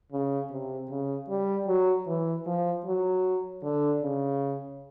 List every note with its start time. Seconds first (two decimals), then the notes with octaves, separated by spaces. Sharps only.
0.12 C#3
0.51 C3
0.90 C#3
1.29 G3
1.68 F#3
2.07 E3
2.46 F3
2.86 F#3
3.63 D3
4.03 C#3